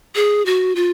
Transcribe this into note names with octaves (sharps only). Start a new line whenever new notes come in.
G#4
F#4
F4